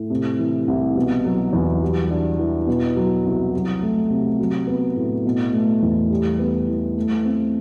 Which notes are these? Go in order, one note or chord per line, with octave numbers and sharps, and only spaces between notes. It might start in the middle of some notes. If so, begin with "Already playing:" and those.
Already playing: A2
C3
E3
C2
B2
F#3
E2
G3
D4
E3
B2
F#3
C2
F#3
A3
C3
F#3
B3
A2
B2
A3
E2
G3
B3
E3
A3
C4